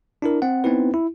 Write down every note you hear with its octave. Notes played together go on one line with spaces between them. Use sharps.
D4 E4 A#4
C4 F#5
B3 C4 D#4 E4 B4
E4